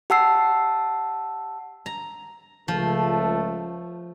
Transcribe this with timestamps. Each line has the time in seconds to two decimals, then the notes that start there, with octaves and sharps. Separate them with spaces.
0.10 G4 F#5 A5 E6 C7
1.86 A#5
2.68 C#2 F3 A3